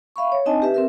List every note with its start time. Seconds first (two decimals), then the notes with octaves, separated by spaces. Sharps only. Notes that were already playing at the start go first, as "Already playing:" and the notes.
0.16 E5 F5 B5 C#6
0.32 C#5
0.46 C4 D4 D#4 D#5 G#5 A5
0.62 G4 B4 E5
0.74 C4 A#4 E5